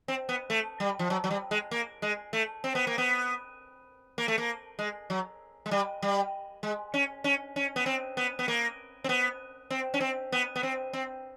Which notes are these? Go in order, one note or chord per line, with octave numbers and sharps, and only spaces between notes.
C4
B3
A3
G3
F3
F#3
F#3
G3
G#3
A#3
G#3
A3
C4
B3
A#3
B3
A#3
A3
A#3
G#3
F#3
G#3
G3
G3
G#3
C#4
C#4
C#4
B3
C4
B3
B3
A#3
C4
B3
C4
C#4
C4
B3
B3
C4
C4